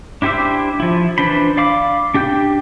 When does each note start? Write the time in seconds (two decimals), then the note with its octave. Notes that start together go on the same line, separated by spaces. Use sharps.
0.22 D4 E4 G4 C5 E5
0.80 F3 E4
1.18 E3 D4 C5 B5
1.57 D5 F5 B5 D6
2.14 D4 G4 G5 G6